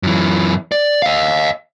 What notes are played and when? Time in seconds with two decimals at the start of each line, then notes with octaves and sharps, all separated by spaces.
0.03 F#2 E3
0.72 D5
1.02 D#5 F5